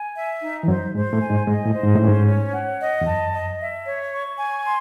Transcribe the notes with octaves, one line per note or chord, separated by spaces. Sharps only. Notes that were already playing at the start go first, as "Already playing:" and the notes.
Already playing: G#5
E5
D#4
E3
F#2 F#3 C5
G#2 G#3 C5
A2 A3
G#5
G#2 G#3
G#2 G#3 D#5
A2
C5
G#2
A2 C#4
G#2
C#5
F#5
D#5
E2
F#2 A5
D#5
E5
C#5
C#6
G#5
C6